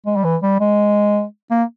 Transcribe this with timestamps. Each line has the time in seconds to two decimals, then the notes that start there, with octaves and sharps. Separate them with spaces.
0.06 G#3
0.16 G3
0.24 E3
0.42 G3
0.60 G#3
1.51 A#3